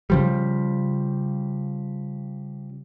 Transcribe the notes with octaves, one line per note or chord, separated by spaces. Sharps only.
C#3 F3 G3